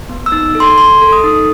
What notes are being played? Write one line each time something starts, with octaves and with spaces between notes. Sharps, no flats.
B3
E6
D#4
A4
C6
A4 C6
A4
D#6
D#4